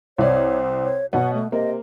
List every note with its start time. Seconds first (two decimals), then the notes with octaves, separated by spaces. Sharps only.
0.18 C2 C4 C#5 D5
0.84 C#5
1.13 B2 F#3 B3 F#5
1.34 A3
1.52 C3 A#3 D#5